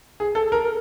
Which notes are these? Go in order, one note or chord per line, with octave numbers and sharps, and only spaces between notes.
G#4
A4
A#4